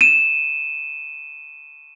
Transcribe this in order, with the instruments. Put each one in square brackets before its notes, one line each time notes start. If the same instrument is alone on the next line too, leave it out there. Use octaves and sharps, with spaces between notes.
[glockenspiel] D#7 E7